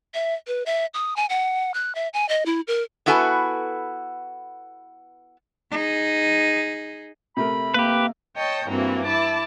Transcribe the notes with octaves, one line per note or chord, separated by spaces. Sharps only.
E5
B4
E5
D#6
G#5
F#5
F#6
E5
G#5
D#5
E4
A#4
B3 E4 F#4 A4 B4 G#5
D#4 G#4
C3 A3 A#4 B5
A#3 G4 B4
C#5 D#5 G5 A5
G2 E3 A#3 C4 F#4
E4 A5 D6